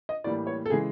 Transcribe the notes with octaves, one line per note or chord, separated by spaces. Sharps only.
D#5
A2 E3 G3 A#3 D5
C#5
A4
C#3 E3 G#3 G#4